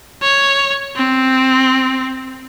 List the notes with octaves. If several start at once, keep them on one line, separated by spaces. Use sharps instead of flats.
C#5
C4